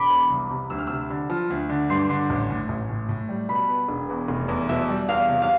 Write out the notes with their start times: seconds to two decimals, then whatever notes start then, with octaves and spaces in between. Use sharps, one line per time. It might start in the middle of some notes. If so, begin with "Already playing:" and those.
Already playing: E1 B5 D6
0.10 E2
0.30 C2
0.50 C3
0.70 D2 E6
0.79 F6
0.87 C3 E6
1.10 D3
1.30 F3
1.50 D2
1.69 D3
1.89 G2 C6
1.99 D6
2.09 D3 C6
2.30 A1
2.50 A2
2.69 A1
2.89 A2
3.09 A2
3.29 G3
3.49 B2 B5
3.69 B3
3.89 E1
4.09 E2
4.28 F1
4.48 E2
4.69 B2 E5
4.88 G3
5.09 E2 F5
5.29 C3
5.42 F5